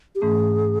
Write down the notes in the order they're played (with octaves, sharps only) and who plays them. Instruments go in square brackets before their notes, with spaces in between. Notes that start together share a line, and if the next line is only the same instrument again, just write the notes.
[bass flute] G4
[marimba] G#2 E3 A3 C#4 [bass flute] G#4